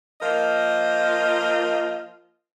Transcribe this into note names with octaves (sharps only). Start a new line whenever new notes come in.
F3 A#3 F4 A#4 D#5